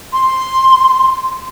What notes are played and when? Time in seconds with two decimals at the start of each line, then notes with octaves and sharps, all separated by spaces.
0.13 C6